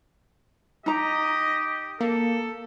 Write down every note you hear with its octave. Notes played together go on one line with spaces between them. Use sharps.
D#4 G4 D#5 A#5
A#3 A4